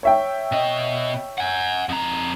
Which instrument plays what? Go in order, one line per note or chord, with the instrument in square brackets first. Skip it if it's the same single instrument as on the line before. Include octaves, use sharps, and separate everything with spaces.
[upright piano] C#5 E5 G5
[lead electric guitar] B2 D#5
F#5 G#5
F2 A#5